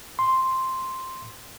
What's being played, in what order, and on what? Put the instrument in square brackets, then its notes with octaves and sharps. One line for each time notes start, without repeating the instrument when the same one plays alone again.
[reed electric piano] C6